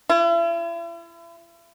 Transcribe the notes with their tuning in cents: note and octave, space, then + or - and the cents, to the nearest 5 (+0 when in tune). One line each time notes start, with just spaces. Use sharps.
E4 +40